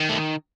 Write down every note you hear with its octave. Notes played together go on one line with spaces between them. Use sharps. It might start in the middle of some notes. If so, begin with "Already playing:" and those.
Already playing: D#3
A3